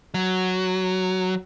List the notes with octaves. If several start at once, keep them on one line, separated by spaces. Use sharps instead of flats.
F#3